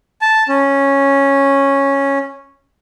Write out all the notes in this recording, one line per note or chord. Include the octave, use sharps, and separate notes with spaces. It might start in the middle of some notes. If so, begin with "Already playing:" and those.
A5
C#4